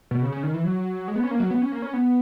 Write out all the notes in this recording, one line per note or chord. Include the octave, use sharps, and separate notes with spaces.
B2
C#3
C#3
D#3
E3
F#3
G#3
B3
C#4
A#3
F#3
B3
C#4
A#3
C#4
B3